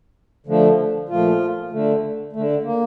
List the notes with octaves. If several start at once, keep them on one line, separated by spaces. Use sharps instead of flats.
D3 F3 A3
A#2 F3 A3 F4
D3 A3
D3 A3
A#3